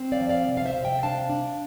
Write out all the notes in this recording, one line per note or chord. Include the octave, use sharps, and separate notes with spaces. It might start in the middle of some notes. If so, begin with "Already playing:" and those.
Already playing: C4
D5 F5
F3
D5 F5
C3
F5
C5 E5
C3
E5 G5
D4 F5 A5
D4